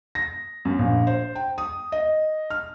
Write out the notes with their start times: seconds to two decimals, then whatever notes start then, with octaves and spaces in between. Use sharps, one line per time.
0.15 A#6
0.65 F#2
0.79 A#1
1.07 C5
1.35 G5
1.58 D#6
1.92 D#5
2.50 F6